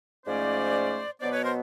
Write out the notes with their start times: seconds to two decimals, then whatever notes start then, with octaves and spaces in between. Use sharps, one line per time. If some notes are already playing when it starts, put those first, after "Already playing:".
0.26 G#2 F3 A3 C#4 C5 D5
1.20 B2 F#3 B3 C5 D5
1.31 B4 C#5
1.43 A#4 C5